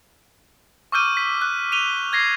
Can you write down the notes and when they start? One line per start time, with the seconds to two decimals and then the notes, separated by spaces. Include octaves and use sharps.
0.92 C#6 D6 E6 F6 G6 D#7
1.17 B6
1.42 F#6
1.72 D#7 F7 G7
2.13 G#6 A#6 C7